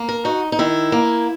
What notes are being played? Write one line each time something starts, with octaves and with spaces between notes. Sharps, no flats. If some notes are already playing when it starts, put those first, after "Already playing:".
Already playing: A#3
A#4
D#4 F#4
D#4
D#3 E4
A#3